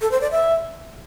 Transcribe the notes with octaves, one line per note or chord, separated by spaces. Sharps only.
A4
C5
D5
E5